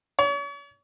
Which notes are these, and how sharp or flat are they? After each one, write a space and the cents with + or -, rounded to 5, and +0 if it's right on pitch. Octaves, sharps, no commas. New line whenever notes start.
C#5 +40